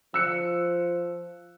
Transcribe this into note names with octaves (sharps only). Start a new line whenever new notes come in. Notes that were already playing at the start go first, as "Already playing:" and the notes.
F3 E6 F#6 C#7